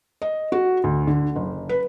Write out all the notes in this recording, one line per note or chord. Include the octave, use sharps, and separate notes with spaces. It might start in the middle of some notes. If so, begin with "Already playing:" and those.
D#5
F#4
D2
D3
F#1
B4